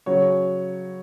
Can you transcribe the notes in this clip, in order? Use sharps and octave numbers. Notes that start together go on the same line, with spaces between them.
C#3 F#3 C#5